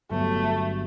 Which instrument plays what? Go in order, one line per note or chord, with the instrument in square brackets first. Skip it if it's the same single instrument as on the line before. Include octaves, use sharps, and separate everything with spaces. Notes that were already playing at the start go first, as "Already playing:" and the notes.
[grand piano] G1 G2 F#3 B3 [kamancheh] A3